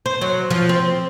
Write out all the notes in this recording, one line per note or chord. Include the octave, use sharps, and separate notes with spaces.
C5
F#3
F3
C4